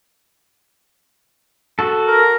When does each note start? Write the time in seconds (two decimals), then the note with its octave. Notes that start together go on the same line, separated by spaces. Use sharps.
1.79 F#4 A4
2.07 A#4